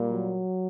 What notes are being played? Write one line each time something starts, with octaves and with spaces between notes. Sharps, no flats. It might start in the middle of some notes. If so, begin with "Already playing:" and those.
Already playing: A#2 G3 A#3
F#3